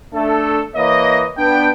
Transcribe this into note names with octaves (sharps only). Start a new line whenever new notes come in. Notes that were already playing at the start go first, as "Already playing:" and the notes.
A3 D4 A4
E3 A#3 C#5 D#5
B3 D4 G5